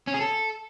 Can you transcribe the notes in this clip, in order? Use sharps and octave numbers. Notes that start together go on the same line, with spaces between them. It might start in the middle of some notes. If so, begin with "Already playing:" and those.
C#4
G#4
A4